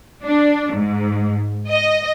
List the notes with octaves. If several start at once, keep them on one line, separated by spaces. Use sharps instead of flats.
D4
G#2
D#5